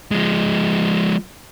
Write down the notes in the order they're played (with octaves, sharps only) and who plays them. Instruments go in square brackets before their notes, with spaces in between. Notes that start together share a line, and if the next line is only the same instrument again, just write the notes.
[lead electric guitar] F3 G#3